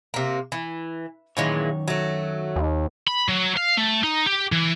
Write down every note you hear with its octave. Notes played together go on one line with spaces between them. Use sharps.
C3 A#3
E3
F#2 A#2 D#3 E3 G#3 C#5
F#3 A3
D#2
B5
F#3
F5
A3
D#4
G4
E3